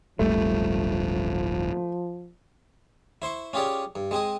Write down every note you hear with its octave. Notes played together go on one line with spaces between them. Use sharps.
D1 G1 F3 G3 A3
E4 C5 C6 C#6
C#4 F4 G4 G#4 C#5 D5
G2
G#3 C4 G#4 D#5